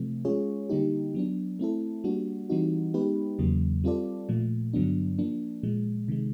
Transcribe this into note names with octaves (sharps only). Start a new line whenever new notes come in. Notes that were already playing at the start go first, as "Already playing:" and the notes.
Already playing: C3 F3 A3 C4
G#3 C#4 F4 G#4 C#5
D3 G3 A#3 D#4 G4
F#3 B3 D4
A3 C4 E4 A4
G3 A#3 D4 F#4
E3 G3 C4 D#4 F#4
G#3 B3 D#4 G4 B4
E2 C#3 F#3 A#3
G3 C4 F4 A4 D5
A#2 F3 A3
G2 D3 F#3 B3 D4
F3 A#3 D4
A#2 F3 G#3
C3 D#3 G#3